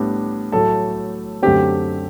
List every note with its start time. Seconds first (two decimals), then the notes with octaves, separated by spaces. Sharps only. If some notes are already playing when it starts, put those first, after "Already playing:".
Already playing: A2 G3 B3 D4
0.52 A2 F#3 A3 A4 A5
1.42 F#2 D3 A3 C4 G4 G5